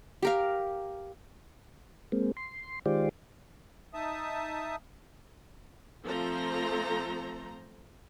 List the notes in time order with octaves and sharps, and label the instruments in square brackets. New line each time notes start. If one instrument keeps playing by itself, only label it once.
[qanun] G4 A#4 F5
[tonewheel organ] G#3 A#3 C4
C6
D#3 G#3 F4 G4 C5 D5
[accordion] D#4 E5 A5 D#6
[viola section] F3 A3 C4 A4 C5 A#5